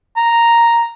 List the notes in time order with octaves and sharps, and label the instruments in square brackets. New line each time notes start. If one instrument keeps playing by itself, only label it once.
[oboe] A#5